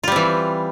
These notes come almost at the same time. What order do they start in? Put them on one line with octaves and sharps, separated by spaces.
F4 G3 C4 E3